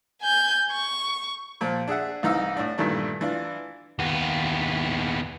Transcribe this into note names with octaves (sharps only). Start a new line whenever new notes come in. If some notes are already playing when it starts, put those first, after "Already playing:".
G#5 G6
C#6
A#2 F3
D4 G#4 E5 F#5
C2 E3 D#4 F5 E6
A2 D4
G2 A#2 D#3 E3 A3 D4
E3 D4 F4
D#2 B3